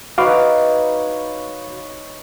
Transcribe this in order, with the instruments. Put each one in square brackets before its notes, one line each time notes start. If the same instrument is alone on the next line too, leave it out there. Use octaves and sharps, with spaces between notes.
[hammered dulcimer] D#4 B4 C#5 [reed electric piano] F#4 F5 D6